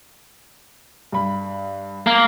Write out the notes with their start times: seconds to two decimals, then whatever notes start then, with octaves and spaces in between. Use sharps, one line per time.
1.12 G2 B5
2.07 A#3